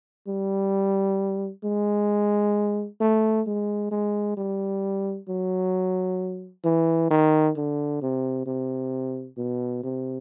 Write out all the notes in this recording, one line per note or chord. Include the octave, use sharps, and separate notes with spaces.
G3
G#3
A3
G#3
G#3
G3
F#3
E3
D#3
D3
C3
C3
B2
C3